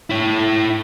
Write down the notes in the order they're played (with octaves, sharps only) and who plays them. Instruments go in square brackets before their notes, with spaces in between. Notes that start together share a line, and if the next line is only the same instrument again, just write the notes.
[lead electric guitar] E4 C#5